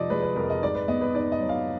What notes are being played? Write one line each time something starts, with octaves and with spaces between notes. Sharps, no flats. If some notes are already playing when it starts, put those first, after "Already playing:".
Already playing: F1 F3 D5 D#5
G#3 B4
B4
F2 A#4
D#5
G#2 D5
B4
B3 D#5
B4
D#4 D5
D#5
F#3
F5